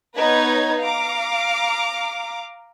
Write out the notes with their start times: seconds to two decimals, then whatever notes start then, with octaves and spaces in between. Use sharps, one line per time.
0.17 B3 D#4 B4 C#5 A#5 G#6
0.79 F5 A#5 D6